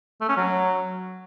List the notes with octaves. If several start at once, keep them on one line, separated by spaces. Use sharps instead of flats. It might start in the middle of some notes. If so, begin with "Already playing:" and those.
A3
C#4
F#3